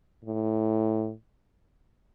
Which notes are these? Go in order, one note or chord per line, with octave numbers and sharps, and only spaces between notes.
A2